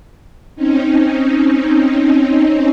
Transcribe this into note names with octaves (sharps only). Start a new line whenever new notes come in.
C4 C#4 D#4